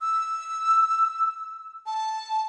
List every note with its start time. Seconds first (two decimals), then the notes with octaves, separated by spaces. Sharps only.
0.01 E6
1.86 A5